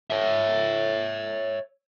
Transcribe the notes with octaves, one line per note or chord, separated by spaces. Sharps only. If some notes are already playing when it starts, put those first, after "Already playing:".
C#5 E5